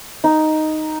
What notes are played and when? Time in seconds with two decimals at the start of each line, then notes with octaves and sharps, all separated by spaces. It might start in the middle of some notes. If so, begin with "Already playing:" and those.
0.24 D#4